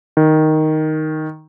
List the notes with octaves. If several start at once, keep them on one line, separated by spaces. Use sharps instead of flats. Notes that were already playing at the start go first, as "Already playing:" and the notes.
D#3